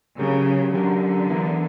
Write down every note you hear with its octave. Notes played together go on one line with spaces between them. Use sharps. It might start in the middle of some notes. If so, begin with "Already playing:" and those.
C#3 F#3 C#4 G4 A#4
D3 F#3 C#4 G4 A#4
E3 B3 E4 A#4